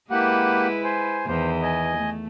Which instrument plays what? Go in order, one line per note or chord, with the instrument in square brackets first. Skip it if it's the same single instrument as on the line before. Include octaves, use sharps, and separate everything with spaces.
[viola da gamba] G#3 E4 B4 [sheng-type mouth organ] A#3 G4 F#5
[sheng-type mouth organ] C5 G#5
[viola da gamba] E2 D#3 E3 [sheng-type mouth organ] C5
[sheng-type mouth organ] D#5 G#5
[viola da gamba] A3